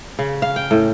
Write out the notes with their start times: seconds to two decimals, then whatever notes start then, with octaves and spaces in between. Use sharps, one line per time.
0.19 C#3
0.42 F5
0.56 G5
0.71 A2